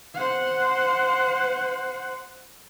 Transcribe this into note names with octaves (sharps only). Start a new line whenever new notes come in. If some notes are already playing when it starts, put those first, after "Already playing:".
C5 F#5